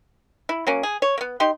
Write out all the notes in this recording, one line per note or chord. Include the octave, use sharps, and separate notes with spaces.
E4
F#3 A#3 C#4
G#4
C#5
A#3 B3
D#4 G4 C6